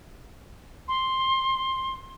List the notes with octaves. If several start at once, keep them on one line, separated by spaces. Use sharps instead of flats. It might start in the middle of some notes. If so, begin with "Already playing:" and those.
C6